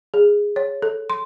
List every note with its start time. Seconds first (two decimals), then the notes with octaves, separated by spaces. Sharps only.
0.14 G#4
0.56 C#5
0.82 A4
1.10 C6